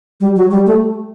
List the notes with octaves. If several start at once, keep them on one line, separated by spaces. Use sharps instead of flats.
G3
F#3
G3
A3